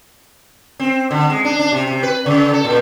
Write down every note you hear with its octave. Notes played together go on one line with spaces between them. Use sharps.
C4
D3
G#3
D4
D4
C3
C3
B4
C#3
A4
A#2